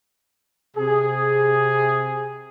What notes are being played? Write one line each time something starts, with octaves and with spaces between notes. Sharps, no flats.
C3 G#4